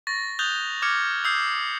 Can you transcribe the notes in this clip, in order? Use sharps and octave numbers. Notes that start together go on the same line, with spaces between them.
C#6 A6 A#6
D#6 F#6 G6 A6 F7 G7
D6 F6 G#6 C#7
D#6 E6 G6 C7